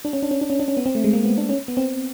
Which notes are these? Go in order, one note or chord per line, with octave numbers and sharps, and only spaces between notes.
D4
C#4
D4
C#4
D4
C#4
D4
C#4
B3
C4
A3
G#3
A#3
B3
D4
C#4
B3
C4